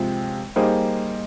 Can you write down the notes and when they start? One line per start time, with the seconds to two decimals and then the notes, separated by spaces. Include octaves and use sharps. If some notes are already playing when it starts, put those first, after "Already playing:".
Already playing: C3 F3 G#3 C4 F4
0.56 G3 A#3 D#4 G#4 C5